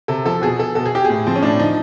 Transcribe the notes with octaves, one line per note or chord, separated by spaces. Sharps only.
C3 A4
F3 A4
B2 G#4
A4
B2 A4
G#4
G4
A2 G#4
F3 C4
C#4
A2 D4
F3 D#4